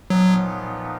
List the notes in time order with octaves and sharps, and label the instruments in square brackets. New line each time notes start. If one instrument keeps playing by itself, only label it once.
[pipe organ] A#2 F3 B3 D#4 [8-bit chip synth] F#3